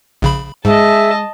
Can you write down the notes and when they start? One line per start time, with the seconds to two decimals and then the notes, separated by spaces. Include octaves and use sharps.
0.22 A#1 C#3 B5
0.65 G#2 G#3 G#4 D#5 E5 A5 E6